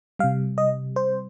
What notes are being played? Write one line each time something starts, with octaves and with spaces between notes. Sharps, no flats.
C3 G3 F5
D#5
C5